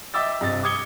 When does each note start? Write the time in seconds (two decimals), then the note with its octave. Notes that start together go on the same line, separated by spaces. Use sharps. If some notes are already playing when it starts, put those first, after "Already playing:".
0.14 D#5 E5 G5 D6 E6 A6
0.41 G2 C3 D#5 A6
0.63 D6 D#6 G#6 C#7 G7